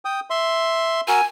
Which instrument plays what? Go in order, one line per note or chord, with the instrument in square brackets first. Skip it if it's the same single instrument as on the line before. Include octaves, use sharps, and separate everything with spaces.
[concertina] G5 D#6
E5 C6
[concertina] F#4 A#4 E6 [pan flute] G#5